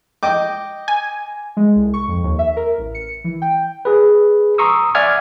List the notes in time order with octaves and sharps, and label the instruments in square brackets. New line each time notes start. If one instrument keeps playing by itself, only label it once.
[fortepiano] D#5 G5 D6
[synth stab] G#5
[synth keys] G#3
C2
C#6
F2
D#2
E5
A#4
A1
C#7
E3
G5
[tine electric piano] G#4 B4
A#5 C6 C#6 D#6 E6
D5 E5 F#5 G#5 F6 G#6